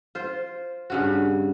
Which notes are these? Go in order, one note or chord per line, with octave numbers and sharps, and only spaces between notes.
F4 C5
G2 C#3 F#4